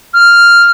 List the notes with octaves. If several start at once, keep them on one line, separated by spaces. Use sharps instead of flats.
F6